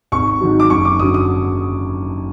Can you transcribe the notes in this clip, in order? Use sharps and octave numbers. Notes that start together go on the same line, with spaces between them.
G#1 C#6
G#2 D#3 F#3
D6
F#1 C#6
D6
F#2 D3 F#3 D#6
D#6